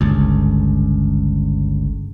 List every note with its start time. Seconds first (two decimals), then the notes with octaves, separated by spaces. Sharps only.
0.01 G1 C#2